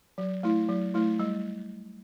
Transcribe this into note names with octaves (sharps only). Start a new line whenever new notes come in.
F#3
A3 E4
F#3
A3 E4
G3